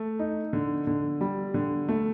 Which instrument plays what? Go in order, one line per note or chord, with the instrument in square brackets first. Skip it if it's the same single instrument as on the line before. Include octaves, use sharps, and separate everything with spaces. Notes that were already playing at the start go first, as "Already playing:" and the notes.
Already playing: [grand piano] A3
D#4
D3
D3
G3
D3
A3